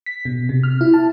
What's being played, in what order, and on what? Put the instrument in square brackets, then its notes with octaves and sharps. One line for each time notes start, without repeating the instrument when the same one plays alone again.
[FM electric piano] B6
B2
C3
F6
E4
A5